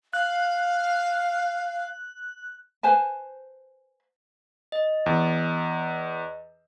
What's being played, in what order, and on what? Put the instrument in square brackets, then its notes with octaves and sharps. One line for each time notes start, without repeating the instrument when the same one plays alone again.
[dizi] F5 [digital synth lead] F#6
[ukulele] B4 C5 G#5 A5
[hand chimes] D#5
[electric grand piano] E2